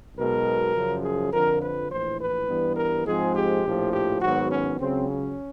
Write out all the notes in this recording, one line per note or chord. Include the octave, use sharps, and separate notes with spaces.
B1 B2 G#3 A#4
F#2 C#3 F3
G#4
F2 D3 F3 A#4
B4
A#1 A2 E3 C5
B4
G2 E3 G3 B3
A#4
G#2 F3 G#3 C4 G#4
G4
A#1 A2 F3
G4
G#2 D#3 F#3 B3 F#4
C#4
C#2 C#3 F#3 C4
C#4